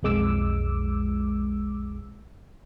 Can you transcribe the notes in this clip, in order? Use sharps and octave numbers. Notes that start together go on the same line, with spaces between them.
B1 F2 G#3 D6 E6